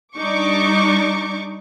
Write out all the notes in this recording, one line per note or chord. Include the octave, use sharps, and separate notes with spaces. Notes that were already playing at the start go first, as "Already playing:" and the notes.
G3 D4 D#4 C#6 D6